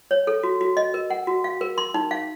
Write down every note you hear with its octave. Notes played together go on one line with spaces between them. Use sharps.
C#5
A4
F#4
F#4
D#5
A#4
F#5
F#4
F5
A#4
C6
D#4
F5